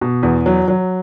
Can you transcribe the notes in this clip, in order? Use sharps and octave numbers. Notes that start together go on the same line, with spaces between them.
B2
E2
F#3
F#3